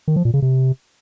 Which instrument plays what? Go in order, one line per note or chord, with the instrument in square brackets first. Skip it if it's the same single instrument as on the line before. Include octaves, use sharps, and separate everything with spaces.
[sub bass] D#3
F3
A#2
C#3
C3